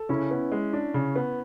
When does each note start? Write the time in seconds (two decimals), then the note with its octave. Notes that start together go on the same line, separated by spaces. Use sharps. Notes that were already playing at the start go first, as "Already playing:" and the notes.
Already playing: A4
0.09 C#3 C#4 E4
0.31 B3
0.52 G#3
0.73 D4
0.94 C#3
1.16 B3